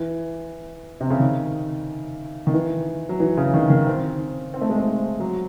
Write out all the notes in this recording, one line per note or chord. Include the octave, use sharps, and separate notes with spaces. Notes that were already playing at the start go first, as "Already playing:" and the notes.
Already playing: E3
C3
C#3
D#3
D#3
E3
F#3
E3
C#3
D#3
D#3
C4
C4
A3
G#3
A3
F#3